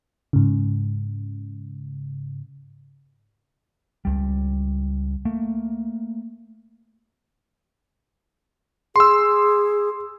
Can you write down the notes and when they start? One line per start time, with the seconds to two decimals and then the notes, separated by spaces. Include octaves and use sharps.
0.33 G#2 C#3
4.05 C#2 G3
5.25 A3 A#3
8.96 G#4 C6 E6